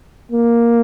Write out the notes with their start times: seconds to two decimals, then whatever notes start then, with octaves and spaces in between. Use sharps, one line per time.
0.32 A#3